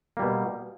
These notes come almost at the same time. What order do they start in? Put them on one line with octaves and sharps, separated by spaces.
A#3 G3 B2